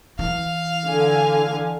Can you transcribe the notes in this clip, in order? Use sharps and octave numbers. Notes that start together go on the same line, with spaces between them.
E3 F5
D3 G#5